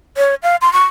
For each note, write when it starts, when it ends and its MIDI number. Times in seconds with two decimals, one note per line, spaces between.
0.17 0.35 73
0.43 0.56 77
0.62 0.72 84
0.73 0.84 85